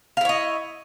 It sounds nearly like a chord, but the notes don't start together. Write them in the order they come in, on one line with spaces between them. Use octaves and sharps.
F5 E4 C#5 D#5